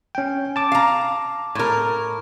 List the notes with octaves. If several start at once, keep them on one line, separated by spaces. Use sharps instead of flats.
C#4 G5
A5 D6
F5 A#5
A2 A#4